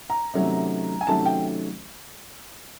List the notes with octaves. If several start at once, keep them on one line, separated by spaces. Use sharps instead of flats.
A#5
C3 D#3 F#3 A3 C#4
G#5
C3 D#3 F#3 A3 C#4 A5
G5